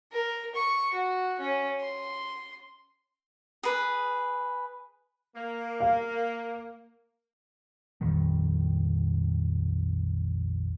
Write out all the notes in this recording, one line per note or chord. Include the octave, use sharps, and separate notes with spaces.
A#4
C#6
F#4
C#4
C6
G#4 B4
A#3
F5
A#1 F2 D#3 G3